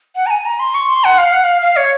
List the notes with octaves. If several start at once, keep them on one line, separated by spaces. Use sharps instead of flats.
F#5
A#5
G#5
A#5
C6
C#6
C6
F#5
F5
F#5
F5
F5
C#5